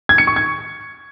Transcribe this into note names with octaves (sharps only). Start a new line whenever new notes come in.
G#6
C#7
C#6
G#6